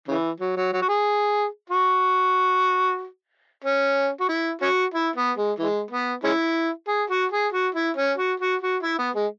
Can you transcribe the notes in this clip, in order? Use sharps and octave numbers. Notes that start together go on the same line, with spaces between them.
C#3 E3
F#3
F#3
F#3
F#4
G#4
F#4
C#4
F#4
E4
C#4 F#4
E4
B3
G#3
E3 G#3
B3
G#3 C#4 E4
G#4
F#4
G#4
F#4
E4
C#4
F#4
F#4
F#4
E4
B3
G#3